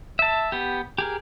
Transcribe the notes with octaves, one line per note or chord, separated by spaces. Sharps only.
E5 A5
B3 G4
G4 G#4 A#4